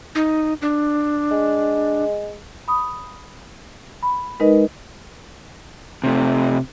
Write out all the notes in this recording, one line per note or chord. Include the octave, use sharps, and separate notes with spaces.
D#4
D4
G#3
B5 D#6
B5
G#3 D#4 A#4 B4 D#5
C3 A3